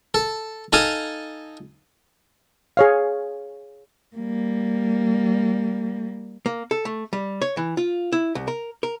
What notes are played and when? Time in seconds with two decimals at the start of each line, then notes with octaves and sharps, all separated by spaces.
0.14 A4
0.73 D#4 A4 F5 G#5 A5 D#6
2.77 G#4 C#5 F5
4.16 G3 A#3
6.46 A#3
6.71 A4
6.85 A3
7.13 G3
7.42 C#5
7.57 E3
7.77 F4
8.12 E4
8.35 C2
8.48 A#4
8.83 A#4